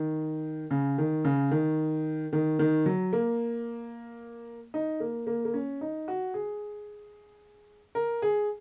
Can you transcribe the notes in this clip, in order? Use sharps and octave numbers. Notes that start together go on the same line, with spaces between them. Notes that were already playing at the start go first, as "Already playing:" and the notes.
Already playing: D#3
C#3
D#3
C#3
D#3
D#3
D#3
F#3
A#3
D#4
A#3
A#3
A#3
C#4
D#4
F#4
G#4
A#4
G#4